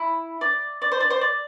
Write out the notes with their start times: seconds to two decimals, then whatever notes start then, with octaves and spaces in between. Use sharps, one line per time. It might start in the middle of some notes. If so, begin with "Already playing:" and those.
Already playing: E4
0.41 D5
0.82 D5
0.92 C5
1.00 D5
1.10 C5
1.21 D5